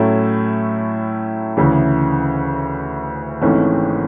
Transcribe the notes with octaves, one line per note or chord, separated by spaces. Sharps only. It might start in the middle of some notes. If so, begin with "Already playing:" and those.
Already playing: A2 F#3 A3 C#4 E4
D2 C#3 E3
G#1 G#2 E3 A3 C#4